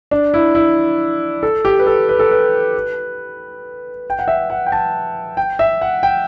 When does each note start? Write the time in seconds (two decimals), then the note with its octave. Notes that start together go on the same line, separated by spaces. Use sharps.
0.11 D4
0.34 E4
0.55 E4
1.43 A4
1.65 G4
1.79 B4
1.87 A4
2.09 B4
2.19 A4
2.31 B4
4.10 G5
4.19 F#5
4.28 E5
4.50 F#5
4.66 G5
4.72 A5
5.37 G5
5.59 E5
5.81 F#5
6.03 G5